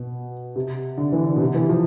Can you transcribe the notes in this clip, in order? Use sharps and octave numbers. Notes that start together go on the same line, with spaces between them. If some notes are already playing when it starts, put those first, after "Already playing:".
Already playing: B2
C3
D3
E3
D3
B2
C3
E3
F3